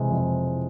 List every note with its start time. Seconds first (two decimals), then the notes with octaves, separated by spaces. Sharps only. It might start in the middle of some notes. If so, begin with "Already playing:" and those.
Already playing: C3 E3 G#3
0.11 F2